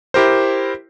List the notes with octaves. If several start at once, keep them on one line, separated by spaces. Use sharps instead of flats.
E4 G4 A#4 C5